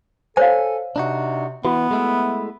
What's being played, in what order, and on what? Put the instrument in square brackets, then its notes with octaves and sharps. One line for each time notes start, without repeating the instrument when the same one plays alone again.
[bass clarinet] A4 [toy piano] C5 C#5 F5 [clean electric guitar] G#5
[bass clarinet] C3 [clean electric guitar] D4 D#4 F#4
[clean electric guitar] E3 [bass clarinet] B3 [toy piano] F#4
[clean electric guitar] G#3 A3 E4